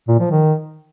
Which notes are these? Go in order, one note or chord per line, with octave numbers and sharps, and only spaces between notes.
A#2
F3
D#3